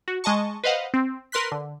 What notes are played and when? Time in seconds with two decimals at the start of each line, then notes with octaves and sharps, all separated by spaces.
0.08 F#4
0.24 G#3 D#5 A5 C#6
0.64 B4 C5 D#5 F5 F#5
0.94 C4
1.32 A#4 B4 C6 F#6 B6
1.52 D3